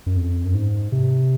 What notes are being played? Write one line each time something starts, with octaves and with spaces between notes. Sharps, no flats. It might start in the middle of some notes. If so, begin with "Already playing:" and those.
F#2
F2
F#2
G#2
C3